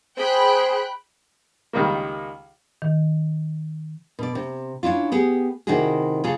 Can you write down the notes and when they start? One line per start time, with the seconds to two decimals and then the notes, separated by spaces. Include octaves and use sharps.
0.18 G#4 C5 G5 B5 F#6
1.73 C#2 D#3 G3 A#3
2.82 D#3
4.19 B2 D5
4.35 C3
4.83 C#4 D4 E4 F4
5.12 B3 G4 G#4
5.67 C3 D#3 D#4 E4 F#4 G#4
6.24 C#3 F4 G#4 A4